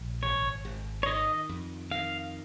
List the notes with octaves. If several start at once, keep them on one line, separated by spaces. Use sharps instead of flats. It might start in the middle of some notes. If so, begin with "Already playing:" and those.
Already playing: A#1
G#1 C#5
G#1
C#5
D#3 D#5
F2
D#3 F5